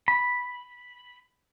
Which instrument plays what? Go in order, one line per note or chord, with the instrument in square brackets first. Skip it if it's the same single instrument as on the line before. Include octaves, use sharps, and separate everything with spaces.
[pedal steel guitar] B5